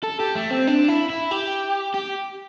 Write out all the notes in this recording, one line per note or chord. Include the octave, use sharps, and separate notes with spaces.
A4
G4
A3
C4
D4
E4
E4
G4
G4